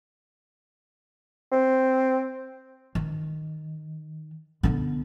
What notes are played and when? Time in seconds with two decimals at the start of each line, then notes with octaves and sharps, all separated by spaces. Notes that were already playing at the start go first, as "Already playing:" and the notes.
1.52 C4
2.95 D#3
4.63 D3 B3